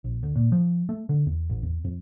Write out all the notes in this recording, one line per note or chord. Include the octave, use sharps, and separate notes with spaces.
A#1
D2
A#2
F3
A3
D3
E2
A1
E2
F2